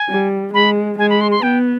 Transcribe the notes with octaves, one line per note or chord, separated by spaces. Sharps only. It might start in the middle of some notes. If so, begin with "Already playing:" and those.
Already playing: G#5
G3
G#3 B5
G#3 G#5
B5
C6
C6
B3 G5